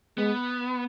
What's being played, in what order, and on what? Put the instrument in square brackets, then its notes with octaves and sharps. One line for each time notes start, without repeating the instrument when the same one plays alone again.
[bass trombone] G#3 [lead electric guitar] B3